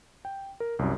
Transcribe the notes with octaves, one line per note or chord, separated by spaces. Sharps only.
G5
A#4
C2 F#2